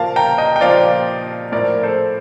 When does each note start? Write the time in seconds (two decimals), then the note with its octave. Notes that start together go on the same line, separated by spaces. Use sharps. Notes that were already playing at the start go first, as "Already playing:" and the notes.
Already playing: A#2 F3 A#4 F5 A5
0.16 G5 A#5
0.38 D#5 G5
0.56 G5
0.61 A#2 F3 D5 F5
1.52 A2 F3 A#4 D5
1.83 A4 C5